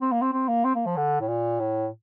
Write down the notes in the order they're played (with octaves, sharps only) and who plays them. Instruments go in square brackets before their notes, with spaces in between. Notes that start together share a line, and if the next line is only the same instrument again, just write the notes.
[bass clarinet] C4
A#3
C4
C4
A#3
C4
A#3
F3
D3
A2
A#2
A2